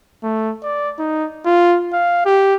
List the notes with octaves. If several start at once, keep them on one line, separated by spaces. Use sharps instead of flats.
A3
D5
D#4
F4
F5
G4